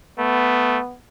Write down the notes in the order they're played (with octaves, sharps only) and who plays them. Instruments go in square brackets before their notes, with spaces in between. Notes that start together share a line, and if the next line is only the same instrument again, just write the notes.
[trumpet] A3 [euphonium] B3